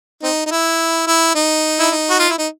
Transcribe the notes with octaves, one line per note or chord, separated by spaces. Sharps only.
C4 D#4
D#4
E4
E4
D#4
E4
D#4
F#4
F4
E4
D#4